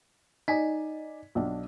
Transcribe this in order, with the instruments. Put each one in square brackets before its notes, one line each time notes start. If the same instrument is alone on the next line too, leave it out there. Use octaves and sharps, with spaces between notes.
[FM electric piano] D#4 [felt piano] D5 G#5 B6
[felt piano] B1 D4